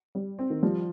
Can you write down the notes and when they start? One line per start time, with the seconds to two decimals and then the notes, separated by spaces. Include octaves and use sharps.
0.15 G3
0.39 C4
0.50 D#3
0.63 F3 G3